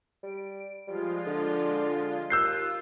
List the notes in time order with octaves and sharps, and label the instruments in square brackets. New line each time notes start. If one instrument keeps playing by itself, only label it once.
[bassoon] G3 [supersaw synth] D7
[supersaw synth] F3 G#3 F4 [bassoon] G3
[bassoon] D3 [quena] D5
[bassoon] D#2 [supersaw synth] F4 [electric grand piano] E6 G6 C7 [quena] F#6